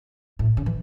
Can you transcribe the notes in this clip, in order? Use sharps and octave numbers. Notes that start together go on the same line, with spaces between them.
A2
C#3
E3